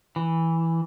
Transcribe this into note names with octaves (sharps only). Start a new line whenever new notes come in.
E3